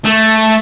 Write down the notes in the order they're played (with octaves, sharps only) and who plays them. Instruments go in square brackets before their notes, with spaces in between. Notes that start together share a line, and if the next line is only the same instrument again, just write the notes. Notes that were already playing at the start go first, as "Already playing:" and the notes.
[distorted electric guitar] A3